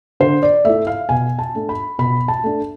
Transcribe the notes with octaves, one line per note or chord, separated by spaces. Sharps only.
D3 C5
D5
A3 E4 E5
F5
B2 G#5
A5
A3 D4
B5
B2 B5
A5
A3 D4